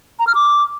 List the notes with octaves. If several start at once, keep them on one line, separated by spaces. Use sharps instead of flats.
A#5
F6
D6